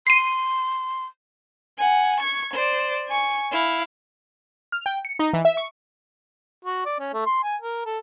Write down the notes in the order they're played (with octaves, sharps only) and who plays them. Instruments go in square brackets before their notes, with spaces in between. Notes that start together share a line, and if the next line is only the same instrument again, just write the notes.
[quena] C6 [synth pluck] C7 D#7
[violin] F#5 G#5
C#6 G#6
C5 D5
G#5 C#6
E4 F5
[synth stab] F6
G5
C#7
D#4
E3
E5
C#6
[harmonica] F#4
D5
C#4
A3
C6
G#5
A#4
A4